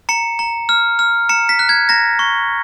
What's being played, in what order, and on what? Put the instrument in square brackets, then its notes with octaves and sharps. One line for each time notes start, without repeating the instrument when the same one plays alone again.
[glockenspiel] A#5 C#7
A#5
F6
F6
A#5 C#7
B6
F#6
G#6
A#5 A#6
C#6